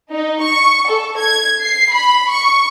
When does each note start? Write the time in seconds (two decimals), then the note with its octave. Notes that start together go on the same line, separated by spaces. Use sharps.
0.11 D#4
0.41 C#6
0.89 A4
1.19 G#6
1.61 C7
1.93 B5
2.30 C#6